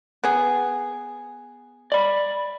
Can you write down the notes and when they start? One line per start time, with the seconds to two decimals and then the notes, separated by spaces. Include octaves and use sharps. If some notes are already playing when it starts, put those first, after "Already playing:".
0.24 B3 G#4
1.92 D5 B5